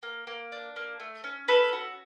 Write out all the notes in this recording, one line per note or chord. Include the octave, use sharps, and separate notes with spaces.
A#3
A#3
D4
A#3
A3
C#4
C#4 A4 B4
F#4